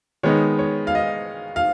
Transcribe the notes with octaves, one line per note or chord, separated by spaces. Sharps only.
D#3 G#3 B3 D#4 C#5
C#5
F5
D#5
F5